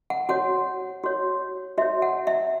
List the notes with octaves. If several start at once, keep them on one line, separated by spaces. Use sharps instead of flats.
F#5
F#4 C#5 F#5
F#4 C#5
F#4 C#5 E5
F#5
E5